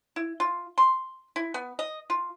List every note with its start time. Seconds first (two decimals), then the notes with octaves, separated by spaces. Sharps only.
0.16 E4
0.40 F4
0.78 C6
1.36 E4
1.54 B3
1.79 D#5
2.10 F4